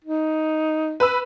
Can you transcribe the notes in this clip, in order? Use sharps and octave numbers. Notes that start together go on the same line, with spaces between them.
D#4
B4 E6